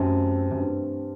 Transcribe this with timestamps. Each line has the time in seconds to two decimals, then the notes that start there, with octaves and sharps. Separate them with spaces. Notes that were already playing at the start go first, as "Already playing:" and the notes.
Already playing: F#2 C3 E3 A3 C4
0.51 F#2
0.58 G2